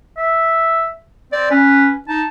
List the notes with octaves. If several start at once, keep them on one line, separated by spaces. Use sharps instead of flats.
E5
C4 D5
C#4 B4
D#4 A5